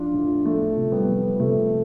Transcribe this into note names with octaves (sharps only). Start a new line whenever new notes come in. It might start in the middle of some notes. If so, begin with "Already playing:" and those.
Already playing: F3 D4 F4
A2
F3 A3
C3
G3 B3
F3
C3 A3